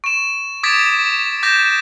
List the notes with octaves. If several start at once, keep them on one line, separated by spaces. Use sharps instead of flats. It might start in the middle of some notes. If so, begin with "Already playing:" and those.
C#6 E7
D6 D#6 G#6 A6 B6 D7
D6 G6 A#6 B6 E7